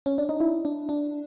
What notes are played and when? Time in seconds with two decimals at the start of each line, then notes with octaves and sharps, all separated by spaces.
0.06 C#4
0.18 D4
0.29 D#4
0.40 E4
0.65 D4
0.89 D4